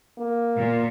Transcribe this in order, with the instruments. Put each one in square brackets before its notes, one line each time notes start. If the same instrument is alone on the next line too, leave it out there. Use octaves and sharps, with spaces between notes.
[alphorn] A#3
[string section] A#2